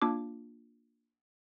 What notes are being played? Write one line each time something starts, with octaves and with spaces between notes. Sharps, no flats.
A#3 D4 F4 D6